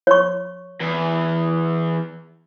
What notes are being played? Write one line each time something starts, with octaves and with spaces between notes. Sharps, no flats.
C#5 C#6
E2